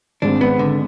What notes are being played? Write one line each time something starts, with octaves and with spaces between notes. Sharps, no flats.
G#1 G#2 G#3 C4 D4
B3
D3